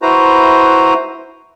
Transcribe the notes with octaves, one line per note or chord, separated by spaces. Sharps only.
E4 F#4 B4 C5 A#5